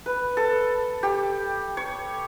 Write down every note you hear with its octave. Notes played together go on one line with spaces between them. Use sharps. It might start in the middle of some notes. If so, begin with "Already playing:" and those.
B4
A4
G4
C#5